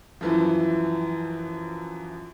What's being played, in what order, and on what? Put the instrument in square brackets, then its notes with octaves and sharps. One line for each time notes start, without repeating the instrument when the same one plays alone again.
[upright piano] F#2 E3 F3